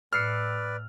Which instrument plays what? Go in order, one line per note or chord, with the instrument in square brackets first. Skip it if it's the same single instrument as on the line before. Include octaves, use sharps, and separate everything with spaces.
[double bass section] A2 [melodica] B4 D5 [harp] E6 C7 C#7 [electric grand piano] F6